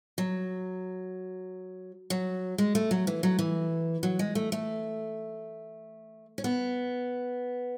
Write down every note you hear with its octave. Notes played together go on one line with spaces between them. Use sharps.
F#3
F#3
G#3
A3
F#3
E3
F#3
E3
F#3
G#3
A3
A3
C#4
B3